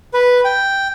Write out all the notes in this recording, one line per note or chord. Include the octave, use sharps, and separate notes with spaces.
B4
G5